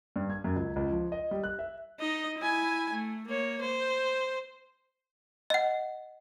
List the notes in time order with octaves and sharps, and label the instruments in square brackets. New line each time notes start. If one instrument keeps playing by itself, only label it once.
[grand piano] G2
G#6
F#2
C#2
C#2
F3
D#5
G3
F#6
E5
[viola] D#4 D#5
E4 G#5
A3
A#3 C#5
C5
[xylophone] D#5 F#5